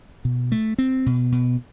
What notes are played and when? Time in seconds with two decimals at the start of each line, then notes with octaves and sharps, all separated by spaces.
0.25 B2
0.52 A3
0.78 C4
1.06 B2
1.32 B2